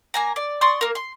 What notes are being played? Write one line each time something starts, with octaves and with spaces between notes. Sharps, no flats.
A#3 G#5 A#5
D5
D5 C6 C#6 D#6
A#3 A#4
C6